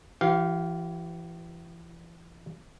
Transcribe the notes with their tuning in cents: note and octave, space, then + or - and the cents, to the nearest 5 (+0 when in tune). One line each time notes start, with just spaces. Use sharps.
E3 +30 G4 -35 F5 +0